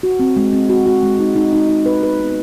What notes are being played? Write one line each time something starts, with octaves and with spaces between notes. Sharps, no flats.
F#4
C4
G#3
C4
F#4
F#4
G#3
D#4
D#4
D#4
D#4
B4
B4
B3